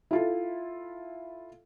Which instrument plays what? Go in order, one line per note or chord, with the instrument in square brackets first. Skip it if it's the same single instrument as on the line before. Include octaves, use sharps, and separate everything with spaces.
[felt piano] E4 F4 A4